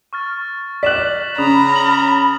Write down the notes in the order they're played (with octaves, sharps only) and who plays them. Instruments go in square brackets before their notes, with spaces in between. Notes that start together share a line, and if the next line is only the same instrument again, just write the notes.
[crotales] C#6 F6 A6
[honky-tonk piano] D5 F#6 [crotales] B6 E7 F#7
[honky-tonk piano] C#3 [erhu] A#5 [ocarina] B5 [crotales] D#6 F7
[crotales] F6 F#7